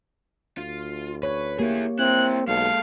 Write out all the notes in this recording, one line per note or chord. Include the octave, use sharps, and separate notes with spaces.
D2 F4
B4 C#5
A#3 E4 G4 G#4
C4 E4 A#4 F#6
B1 G#3 A4 F5